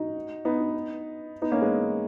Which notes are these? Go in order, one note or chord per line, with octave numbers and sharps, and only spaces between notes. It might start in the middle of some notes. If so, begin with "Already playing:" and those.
Already playing: D#4 F#4
B3 D#4
B3 D#4
A#3 C#4
G#3 B3